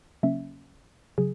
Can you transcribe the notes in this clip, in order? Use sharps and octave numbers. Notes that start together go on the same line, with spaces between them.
C#3 F#3 A#3 C#4 E5
C#3 F#3 G#4